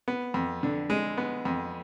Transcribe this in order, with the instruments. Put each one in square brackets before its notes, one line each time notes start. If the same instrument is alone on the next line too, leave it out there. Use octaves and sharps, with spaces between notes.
[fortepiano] B3
F2
D3
G#3
B3
F2